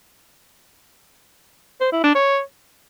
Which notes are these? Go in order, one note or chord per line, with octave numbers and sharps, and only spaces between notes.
C5
E4
D4
C#5